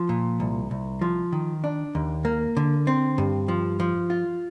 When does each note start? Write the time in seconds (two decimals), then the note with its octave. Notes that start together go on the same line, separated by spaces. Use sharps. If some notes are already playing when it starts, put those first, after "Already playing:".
Already playing: F3
0.09 A#2
0.40 C2
0.71 C2
1.01 F3
1.32 D#3
1.64 D4
1.95 D#2
2.25 A#3
2.57 D3
2.87 C4
3.18 G2
3.48 F3
3.80 F3
4.10 F4